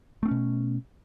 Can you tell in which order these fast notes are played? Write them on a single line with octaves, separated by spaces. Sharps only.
A3 C4 C#4 B2